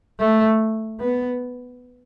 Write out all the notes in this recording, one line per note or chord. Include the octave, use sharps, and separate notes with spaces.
A3
B3